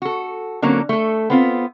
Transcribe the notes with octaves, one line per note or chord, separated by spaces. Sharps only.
F#4 A4
D3 F#3 A#3 C4 C#4
A3 A4
B3 C4 F4